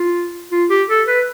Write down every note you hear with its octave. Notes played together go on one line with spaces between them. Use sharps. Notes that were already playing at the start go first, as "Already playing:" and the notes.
Already playing: F4
F4
G4
A4
B4